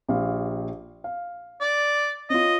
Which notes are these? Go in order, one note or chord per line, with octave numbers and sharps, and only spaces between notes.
A#1 G4 F5
F5
D5
C#4 F4 D#5